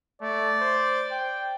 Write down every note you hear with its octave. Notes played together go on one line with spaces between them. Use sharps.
A3 D5
C5
G5